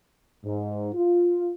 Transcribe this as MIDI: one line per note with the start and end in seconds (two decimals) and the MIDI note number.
0.45 0.89 44
0.93 1.53 65